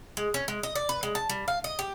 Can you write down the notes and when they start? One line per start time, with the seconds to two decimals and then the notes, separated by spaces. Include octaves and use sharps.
0.17 G#3
0.34 C#4
0.48 G#3
0.63 D#5
0.75 D5
0.89 B4
1.03 G#3
1.15 A5
1.29 G3
1.48 F5
1.64 D#5
1.79 G4